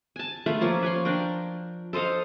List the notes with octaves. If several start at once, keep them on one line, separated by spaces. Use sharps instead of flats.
G#5 A5
A3 F4 A#4 B4
F3 A#3 C#4
B4 C#5 C6
D4 A#4 G5
A4 C5 D#5 F5